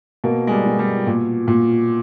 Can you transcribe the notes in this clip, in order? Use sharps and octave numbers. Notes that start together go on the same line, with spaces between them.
B2 A#3
G#3
G3
B2
G3
A#2
A#2